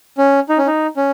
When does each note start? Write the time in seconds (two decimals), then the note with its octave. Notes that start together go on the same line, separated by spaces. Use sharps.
0.18 C#4
0.49 D#4
0.58 C#4
0.67 D#4
0.97 C#4